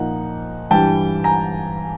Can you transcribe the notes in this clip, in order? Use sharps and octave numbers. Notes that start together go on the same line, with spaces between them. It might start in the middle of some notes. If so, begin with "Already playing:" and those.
Already playing: A#2 F3 A#3 D#4 F#5
G2 E3 G3 G5 A5
G#5 A#5